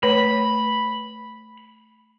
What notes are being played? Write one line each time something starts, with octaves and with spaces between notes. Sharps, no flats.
A3 B4 C#5 B5